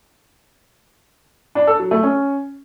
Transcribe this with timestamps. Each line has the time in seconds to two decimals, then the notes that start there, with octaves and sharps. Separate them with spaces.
1.55 D4
1.67 A4
1.79 F#3
1.91 A3
2.03 C#4